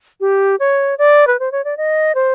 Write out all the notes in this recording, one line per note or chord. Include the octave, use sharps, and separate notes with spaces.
G4
C#5
D5
B4
C5
C#5
D5
D#5
C5